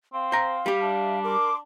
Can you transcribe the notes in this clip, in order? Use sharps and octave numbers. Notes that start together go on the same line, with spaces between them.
C4 F5
C5 A#5
G3 G4
D4 E5
A#4 C6 D6